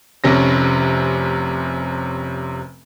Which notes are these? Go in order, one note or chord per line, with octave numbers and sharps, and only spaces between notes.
F1 C3 C#4 A#6